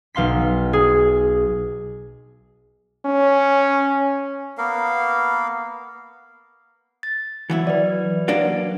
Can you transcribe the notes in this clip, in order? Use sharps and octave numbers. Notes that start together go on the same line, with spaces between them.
B1 F5 C6 B6
G#4
C#4
A#3 B3 A#4 F5
A6
E3 F#3 E4
B4 D5
F#3 A#3 D4